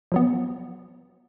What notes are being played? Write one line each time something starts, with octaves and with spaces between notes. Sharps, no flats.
F3 F#3 B3